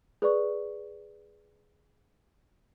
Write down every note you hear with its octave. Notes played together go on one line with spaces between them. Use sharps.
G#4 B4 D5 C#6